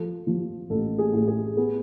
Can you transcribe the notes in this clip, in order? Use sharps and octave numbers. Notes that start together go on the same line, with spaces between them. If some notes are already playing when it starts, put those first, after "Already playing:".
Already playing: F3 A4
F3
A1 A4
G#4
A2
G#4
B3 G#4